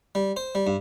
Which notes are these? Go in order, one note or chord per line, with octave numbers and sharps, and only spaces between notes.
G3
C5
G3
G2